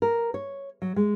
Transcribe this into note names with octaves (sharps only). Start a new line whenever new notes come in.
A#4
C#5
F#3
G#3